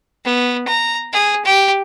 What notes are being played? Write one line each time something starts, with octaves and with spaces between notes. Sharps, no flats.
B3
A#5
G#4
G4